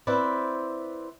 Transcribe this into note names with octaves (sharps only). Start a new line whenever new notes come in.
C4 E4 B4 C5 D5